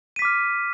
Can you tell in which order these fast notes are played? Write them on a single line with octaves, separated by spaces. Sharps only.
D#7 B6 D6 F6